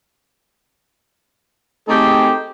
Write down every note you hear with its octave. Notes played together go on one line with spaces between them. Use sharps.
A3 C4 D#4 G4 G#4